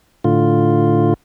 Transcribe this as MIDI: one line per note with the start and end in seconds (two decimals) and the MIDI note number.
0.24 1.14 45
0.24 1.14 50
0.24 1.14 65